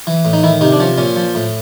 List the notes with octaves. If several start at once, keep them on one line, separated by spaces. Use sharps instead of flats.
E3
A2
D#4
D#3 E4
C3 D#4
D4
F3 C#4
A#2 C#4
F3
A2